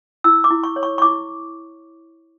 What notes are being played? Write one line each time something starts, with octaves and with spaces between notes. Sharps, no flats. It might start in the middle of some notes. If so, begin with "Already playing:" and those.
E4 E6
D6
E4
C#6
C#5
C#6
C#6
E4 D6